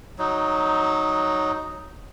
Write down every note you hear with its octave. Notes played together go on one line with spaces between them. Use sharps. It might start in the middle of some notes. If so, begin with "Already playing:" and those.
F#3 D#4